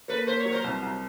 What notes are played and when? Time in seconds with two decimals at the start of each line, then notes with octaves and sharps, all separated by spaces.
0.08 A#3 A4 B4
0.27 A#3 C5
0.40 C#5
0.45 F#3
0.51 A#4 C5
0.64 C2
0.82 C2